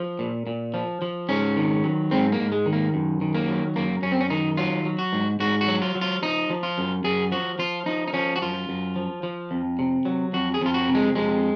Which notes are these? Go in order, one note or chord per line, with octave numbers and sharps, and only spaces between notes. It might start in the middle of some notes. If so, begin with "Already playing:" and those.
Already playing: F3
A#2
A#2
F3
F3
G#2 C#4
D#3
F#3
G#2 C4
A#3
G#2
G#3
D#3
A#3
F#2
D#3
A#3
F#3
F#2 A#3
F#2 C#4
C4
C#4
D#3 D#4
F#3 F4
F#3
F#4
G#2
G#2 F#4
F#4
F#3
F4
F#3
F4
F3 D#4
F3
F4
F#2
F#2 G#4
F3 F#4
F3 F4
F3 D#4
D#4
F3 C#4
F#4
F#2 F4
F#2
F3
F3
F2
C3
F#3
F2 F#4
G#4
F2 F4
F#4
C3
G#3
F2 G#3